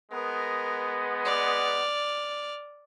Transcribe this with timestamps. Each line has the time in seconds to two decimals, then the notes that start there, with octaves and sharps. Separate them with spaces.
0.12 G#3 B3 A#4
1.25 D5 F6